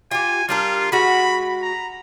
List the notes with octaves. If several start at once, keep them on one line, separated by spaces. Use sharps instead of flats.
F4 G4 G#5
G3 D4 F4 A#4
G#3 F#4 B5
A#5